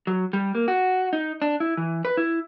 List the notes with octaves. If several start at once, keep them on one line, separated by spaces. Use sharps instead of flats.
F#3
G3
A#3
F#4
D#4
D4
E4
E3
B4
E4